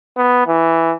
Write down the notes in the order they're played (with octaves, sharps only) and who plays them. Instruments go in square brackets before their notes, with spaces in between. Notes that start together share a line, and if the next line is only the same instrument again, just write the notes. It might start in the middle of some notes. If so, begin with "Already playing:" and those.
[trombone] B3
E3